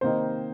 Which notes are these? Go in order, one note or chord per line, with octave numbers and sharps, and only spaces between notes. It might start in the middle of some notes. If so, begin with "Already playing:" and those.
C3 D#3 A#3 D#4 C5